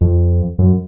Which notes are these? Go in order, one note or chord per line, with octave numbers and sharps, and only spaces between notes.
F2
F#2